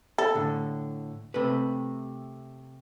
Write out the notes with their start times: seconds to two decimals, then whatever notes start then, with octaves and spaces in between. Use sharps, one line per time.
0.18 A4
0.35 A2 D3
1.34 C3 A3 B4